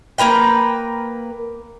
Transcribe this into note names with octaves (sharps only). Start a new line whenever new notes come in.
A#3 A#4 B4 G5